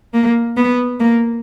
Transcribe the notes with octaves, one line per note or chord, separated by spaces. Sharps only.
A#3
B3
A#3